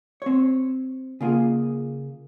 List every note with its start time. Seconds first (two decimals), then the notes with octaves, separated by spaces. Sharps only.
0.22 C4 C#5
1.21 C#3 A#3 F4 G#4